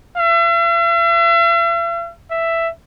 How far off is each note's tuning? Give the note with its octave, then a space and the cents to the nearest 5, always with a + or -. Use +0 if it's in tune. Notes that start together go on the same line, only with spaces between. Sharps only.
E5 +45
E5 +10